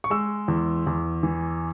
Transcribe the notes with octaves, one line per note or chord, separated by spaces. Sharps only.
C#6
G#3 E6
E2
E2
E3